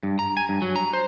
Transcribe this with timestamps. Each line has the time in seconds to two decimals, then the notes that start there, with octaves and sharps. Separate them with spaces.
0.03 G2
0.19 A#5
0.37 G#5
0.49 G2
0.62 F#3
0.76 A#5
0.93 C5